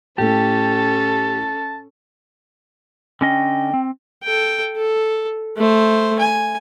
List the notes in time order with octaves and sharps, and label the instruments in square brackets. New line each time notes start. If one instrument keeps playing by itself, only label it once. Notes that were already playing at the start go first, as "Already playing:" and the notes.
[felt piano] A2 A3 [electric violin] C#4 A4 [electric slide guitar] G4 [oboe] A5
[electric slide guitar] D3 C#4 D#5 [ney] G5
[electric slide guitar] C4
[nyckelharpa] A4 G5
A4
A3 C5
G#5